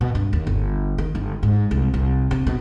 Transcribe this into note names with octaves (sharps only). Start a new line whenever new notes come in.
B2
G2
D#2
G1
D#3
G1
G#2
C2
C2
C3
B2